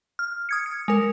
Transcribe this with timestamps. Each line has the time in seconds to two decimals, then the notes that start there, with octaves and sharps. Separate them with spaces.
0.19 F6
0.49 D#6 G#6 C#7
0.66 C#7
0.88 G#3 A#4